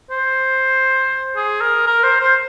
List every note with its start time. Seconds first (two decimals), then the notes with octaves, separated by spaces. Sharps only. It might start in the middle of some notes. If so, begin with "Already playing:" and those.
0.11 C5
1.36 G#4
1.61 A#4
1.87 A#4
2.03 C5
2.21 C5